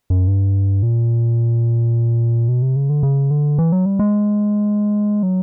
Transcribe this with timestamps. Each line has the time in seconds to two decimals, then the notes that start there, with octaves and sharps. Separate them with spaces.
0.10 F#2
0.27 G2
0.83 A#2
2.48 B2
2.62 C3
2.76 C#3
2.90 D3
3.03 C#3
3.31 D3
3.58 E3
3.72 F#3
3.85 G3
3.99 G#3
5.23 F#3